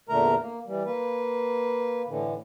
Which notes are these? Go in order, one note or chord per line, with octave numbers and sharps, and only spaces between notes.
E2 A#2 D3 A3 A#4 A#5
A#3
E3 G3
A#3 B4
A2 D3 E3